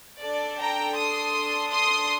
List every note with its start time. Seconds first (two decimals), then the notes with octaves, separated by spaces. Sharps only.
0.21 D4 A4 D5
0.58 G5 A#5
0.96 C6 D#6
1.70 C6 D#6